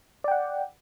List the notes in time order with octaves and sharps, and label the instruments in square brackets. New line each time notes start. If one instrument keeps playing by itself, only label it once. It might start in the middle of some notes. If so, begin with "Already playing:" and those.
[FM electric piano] D5
G5
F#5